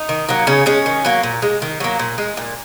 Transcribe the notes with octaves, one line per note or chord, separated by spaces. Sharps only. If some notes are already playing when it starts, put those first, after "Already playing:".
Already playing: D#4
D#3
F#3 A#3
C#3 C#4
G#3 C#4
D#3
F#3 A#3
A#2
G#3
D#3
F#3 A#3
A#2
G#3
A#2